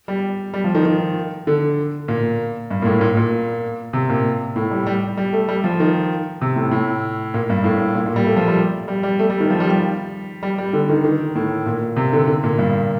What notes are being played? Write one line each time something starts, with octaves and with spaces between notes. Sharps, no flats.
G3
G3
F3
D#3
D#3
D3
A#2
G2
A#2
A2
A#2
A#2
C3
A#2
A2
G3
G3
G3
A3
G3
F3
D#3
C3
A2
A2
A#2
G2
A2
A#2
A#2
G3
A3
F3
G3
G3
G3
A3
G3
D#3
F3
G3
G3
G3
G3
D3
D#3
D#3
A2
A#2
C3
D3
D3
A#2
G2